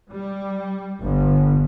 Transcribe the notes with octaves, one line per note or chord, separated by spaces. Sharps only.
G3
G1